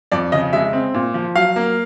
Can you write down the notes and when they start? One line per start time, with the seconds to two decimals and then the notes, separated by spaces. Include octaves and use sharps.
0.12 F2 D5
0.32 C#3 D#5
0.53 G#3 E5
0.73 C4
0.94 A#2
1.14 F3
1.35 F#3 F5
1.56 A#3